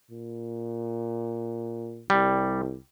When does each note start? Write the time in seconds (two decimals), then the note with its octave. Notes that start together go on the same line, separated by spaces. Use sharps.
0.11 A#2
2.10 C2 G3